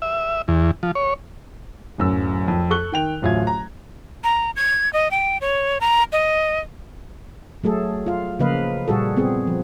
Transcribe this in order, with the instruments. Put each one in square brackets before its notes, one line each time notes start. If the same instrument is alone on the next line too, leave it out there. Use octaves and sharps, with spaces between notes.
[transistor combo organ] E5
E2
F3
C#5
[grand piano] D1 F#2 E6
F2
A4 C#6 F#6 G7
D#3 G5 F7
D1 A1 F4 E5 G#6
A#5
[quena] A#5
G#6
D#5
G5
C#5
A#5
D#5
[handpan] F#3 A3 G#4 A4
F4 F5
C#3 F3 A#3 B4 D#5 F5
A#2 G3 F#4 G#4 A4
B3 C4 G#4
F3